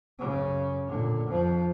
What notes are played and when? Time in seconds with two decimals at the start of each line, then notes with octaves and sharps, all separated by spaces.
0.19 F#2 C#3
0.87 A#2 D3
1.28 F2 F3